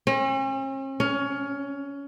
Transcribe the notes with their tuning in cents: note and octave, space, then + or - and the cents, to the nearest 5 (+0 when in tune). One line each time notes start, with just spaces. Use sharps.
C#4 -45
C#4 +20